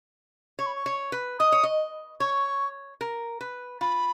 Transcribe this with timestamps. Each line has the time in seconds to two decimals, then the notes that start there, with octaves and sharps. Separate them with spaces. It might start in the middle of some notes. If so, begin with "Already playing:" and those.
0.59 C#5 C#6
0.66 B5
0.75 C#6
0.86 C#5
1.12 B4
1.39 D#5 D#6
1.52 C#5
1.63 D#5
2.20 C#5 C#6
3.01 A#4
3.41 B4
3.81 F4 B5